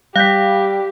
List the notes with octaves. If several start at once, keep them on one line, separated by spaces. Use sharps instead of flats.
G3 G4 F5 F#6 G6 B6